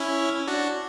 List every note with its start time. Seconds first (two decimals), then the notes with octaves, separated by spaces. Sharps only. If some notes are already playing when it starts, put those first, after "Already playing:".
Already playing: C#4 E4
0.47 D4 F#4